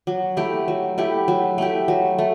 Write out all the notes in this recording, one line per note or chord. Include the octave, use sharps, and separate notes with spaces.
F#3
A3 E4 G4
F#3
A3 E4 G4
F#3
A3 E4 G4
F#3
A3